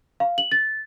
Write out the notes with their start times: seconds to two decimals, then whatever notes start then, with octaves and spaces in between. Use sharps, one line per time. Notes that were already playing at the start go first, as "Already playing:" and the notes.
0.20 F5
0.38 F#7
0.52 A6